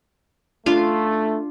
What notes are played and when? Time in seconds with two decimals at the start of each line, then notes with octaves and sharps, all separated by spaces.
0.66 A3 D4 F4 F5